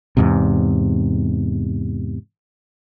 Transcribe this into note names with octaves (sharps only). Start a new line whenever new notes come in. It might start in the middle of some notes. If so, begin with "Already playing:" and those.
E2 G#2 C3